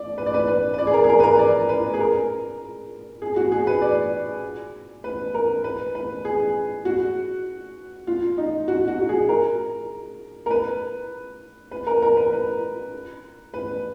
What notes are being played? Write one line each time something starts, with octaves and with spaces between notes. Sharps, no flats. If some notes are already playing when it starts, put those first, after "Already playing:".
Already playing: D5
B4
D5
B4
B4
B4
D5
G#4
A#4
G#4
A#4
B4
A#4
D5
B4
G#4
A#4
G#4
F#4
G#4
B4
D5
B4
A#4
B4
B4
G#4
F#4
F4
D#4
F#4
F#4
F#4
G#4
A#4
A#4
B4
B4
A#4
A#4
B4
B4
B4